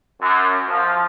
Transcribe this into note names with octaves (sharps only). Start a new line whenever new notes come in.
F#2
F3